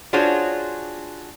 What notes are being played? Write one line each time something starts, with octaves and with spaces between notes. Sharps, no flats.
D4 F4 F#4 G#4 C5 C#5